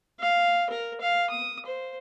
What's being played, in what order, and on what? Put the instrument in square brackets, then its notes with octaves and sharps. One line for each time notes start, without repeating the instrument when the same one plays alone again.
[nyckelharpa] F5
A#4
F5
D#6
C5